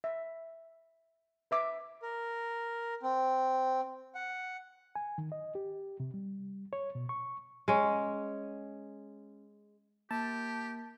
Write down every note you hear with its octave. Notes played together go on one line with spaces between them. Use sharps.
E5
B4 E5 D6
A#4
C4
F#5
G#5
D#3
D#5
G4
C3
G3
C#5
B2
C#6
G#3 C#4
A#3 G4 A5